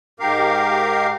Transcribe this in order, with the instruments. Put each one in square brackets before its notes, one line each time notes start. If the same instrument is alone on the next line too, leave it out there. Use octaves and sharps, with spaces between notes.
[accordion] G#2 G4 A#4 F5